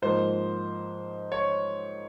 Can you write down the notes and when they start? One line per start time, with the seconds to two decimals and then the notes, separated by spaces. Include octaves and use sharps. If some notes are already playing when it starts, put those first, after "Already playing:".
0.02 G#2 F3 A#3 C5
1.32 C#5